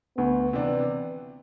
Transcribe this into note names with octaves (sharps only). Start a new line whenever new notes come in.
D2 B3
C3 E3 B3 D4